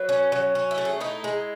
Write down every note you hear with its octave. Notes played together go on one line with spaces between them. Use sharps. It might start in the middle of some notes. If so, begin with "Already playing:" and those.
Already playing: F#3 B4
C#4
F#3
C#4
E4
A3
G#4
D#4 E4
G#3